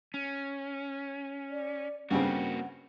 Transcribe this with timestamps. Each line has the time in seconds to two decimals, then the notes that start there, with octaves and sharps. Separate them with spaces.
0.14 C#4
1.51 D5
2.11 G2 C#3 A#3 C4 F#4 F#5